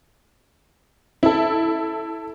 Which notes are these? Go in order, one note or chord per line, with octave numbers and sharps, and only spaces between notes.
E4 A4